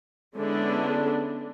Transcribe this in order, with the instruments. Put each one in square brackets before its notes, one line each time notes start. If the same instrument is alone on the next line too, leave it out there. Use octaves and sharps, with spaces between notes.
[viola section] D3 G#3 B3 C#4 D4 E4